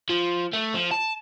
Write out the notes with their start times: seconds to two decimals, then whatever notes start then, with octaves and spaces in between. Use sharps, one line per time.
0.10 F3
0.53 A3
0.74 F3
0.91 A5